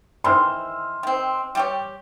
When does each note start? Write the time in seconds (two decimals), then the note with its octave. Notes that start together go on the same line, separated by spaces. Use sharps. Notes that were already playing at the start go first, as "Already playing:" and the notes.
0.24 D#3 E3 C5 C6 E6 F6
1.03 D#3 C4
1.55 G3 G4 C#5